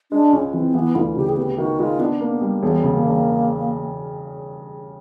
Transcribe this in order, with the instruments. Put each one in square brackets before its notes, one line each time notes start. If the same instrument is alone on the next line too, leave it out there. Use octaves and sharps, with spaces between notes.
[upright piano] G#3 [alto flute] D4
[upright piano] C#2 [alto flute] C#4
[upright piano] E3 [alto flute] C4
[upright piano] E3 [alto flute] B3
[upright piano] D2 [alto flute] F4
[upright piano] C#3 [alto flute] G4
[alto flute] G#4
[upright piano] B3 [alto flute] G4
[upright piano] D#3 [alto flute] F#4
[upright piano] G#3 [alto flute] F4
[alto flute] B3 [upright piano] D4
[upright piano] A#3
[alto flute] B3
[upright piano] G3
[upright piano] E1 [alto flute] B3
[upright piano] C#3
[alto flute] A#3
[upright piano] E1